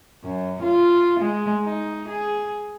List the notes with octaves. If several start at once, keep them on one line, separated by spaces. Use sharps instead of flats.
F#2
F4
G#3
D#4
G#4